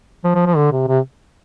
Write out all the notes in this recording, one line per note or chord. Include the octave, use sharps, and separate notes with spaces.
F3
F3
F3
D3
C3
C3